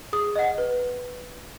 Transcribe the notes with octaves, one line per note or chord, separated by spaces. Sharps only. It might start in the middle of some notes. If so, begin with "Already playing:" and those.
G#4 D#6
D#5 F#5
B4